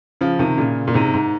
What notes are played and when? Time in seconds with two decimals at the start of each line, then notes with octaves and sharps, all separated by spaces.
0.21 C#3 F3
0.39 C3 D#3
0.57 A#2 C#3
0.88 A#2
0.94 G#2 C3
1.14 G#2